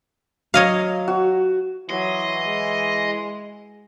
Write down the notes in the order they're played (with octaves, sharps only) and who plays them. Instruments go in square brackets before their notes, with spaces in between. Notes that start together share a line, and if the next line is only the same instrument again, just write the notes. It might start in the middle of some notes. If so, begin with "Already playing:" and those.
[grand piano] F#3 [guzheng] C#5 D#5 F5
[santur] F#4
[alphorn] E3 [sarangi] F#3 [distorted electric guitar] D#5 [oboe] C6
[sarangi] G#3